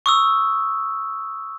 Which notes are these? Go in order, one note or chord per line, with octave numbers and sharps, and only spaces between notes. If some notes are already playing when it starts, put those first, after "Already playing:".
C#6 D#6 E6